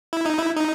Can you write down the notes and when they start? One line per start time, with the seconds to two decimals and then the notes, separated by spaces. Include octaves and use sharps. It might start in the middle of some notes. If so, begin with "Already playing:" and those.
0.13 E4
0.26 D#4
0.38 E4
0.56 D#4